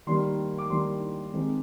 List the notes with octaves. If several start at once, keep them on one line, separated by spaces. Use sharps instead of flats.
D#3 G3 A#3 C6
D6
D#3 G3 A#3 C6
D#3 G#3 C4 D#4